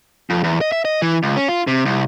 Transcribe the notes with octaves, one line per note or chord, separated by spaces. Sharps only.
F2
E2
D#5
E5
D#5
E3
C#2
C#4
F4
C3
C2